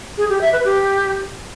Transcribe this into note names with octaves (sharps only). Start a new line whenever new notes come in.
G#4
G4
E5
B4
G4